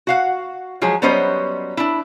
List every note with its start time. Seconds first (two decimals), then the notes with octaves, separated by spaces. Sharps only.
0.07 F#4 F5 F#5
0.82 F3 F#3 G#3 G#4
1.02 F#3 G3 B3 C#4 C5 D#5
1.77 D4 E4